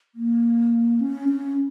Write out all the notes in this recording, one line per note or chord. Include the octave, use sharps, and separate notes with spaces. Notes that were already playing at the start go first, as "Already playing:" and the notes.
A#3
C#4
C#4